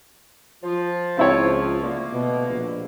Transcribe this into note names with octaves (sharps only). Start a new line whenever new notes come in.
F3 F4
C#2 C4 E4 C#5
D3 A3 A#3
B2
A#1